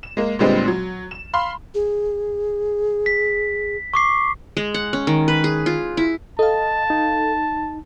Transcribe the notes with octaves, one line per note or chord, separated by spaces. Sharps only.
E7
G#3 A#3
A#2 D3 G3 G#3 B3 C4
F#3
E7
F5 B5 C6
G#4
B6
C#6 D6 C7
G#3
F#5
C#4
D#3
B4
G#4
F4
E4
A4 D#5 F5 A5
D#4